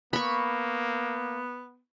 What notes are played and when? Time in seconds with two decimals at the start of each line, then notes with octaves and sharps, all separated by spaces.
0.13 A#3 B3 B5 C#6